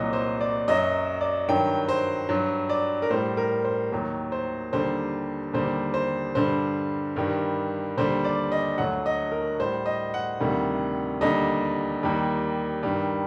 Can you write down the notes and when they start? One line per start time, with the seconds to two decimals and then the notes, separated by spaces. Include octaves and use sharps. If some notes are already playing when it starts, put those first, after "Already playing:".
Already playing: C2 A#2 F#3 D#5
0.13 C5
0.41 D5
0.68 F#2 F#3 D#5
1.21 D5
1.48 G2 D#3 F#3 G5
1.89 C5
2.29 G2 F#3
2.69 D5
3.02 A#4
3.11 A2 G3 C5
3.37 A#4
3.65 C5
3.92 D#2 D#3 F#3
4.32 C5
4.73 D#2 D3 G3 C5
5.53 D#2 D3 G3 C5
5.94 C5
6.35 G2 D3 G3 C5
7.16 G2 D#3 G3
7.97 D#2 D3 G3 C5
8.25 D5
8.52 D#5
8.78 D2 D3 F#3 F#5
9.06 D#5
9.32 A#4
9.59 A2 G3 C5
9.86 D#5
10.14 F#5
10.40 D2 C3 D#3 G3
11.21 D#2 D3 G3 D#5
12.03 D#2 D#3 G3
12.83 G2 D#3 G3